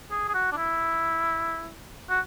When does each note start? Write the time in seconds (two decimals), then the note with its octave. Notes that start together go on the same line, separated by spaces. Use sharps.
0.11 G#4
0.29 G#4
0.34 F#4
0.52 D4
0.57 E4
2.09 F#4